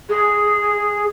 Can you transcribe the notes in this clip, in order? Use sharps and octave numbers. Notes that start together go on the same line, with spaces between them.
G#4